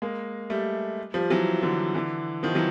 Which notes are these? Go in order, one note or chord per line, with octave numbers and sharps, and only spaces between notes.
G#3 A#3
G3 A3
F3 G3
E3 F#3
D3 E3
D3 E3
D#3 F3
E3 F#3